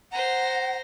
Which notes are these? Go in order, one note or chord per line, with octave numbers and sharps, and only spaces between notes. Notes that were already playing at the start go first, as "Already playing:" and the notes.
C5 F#5 A#5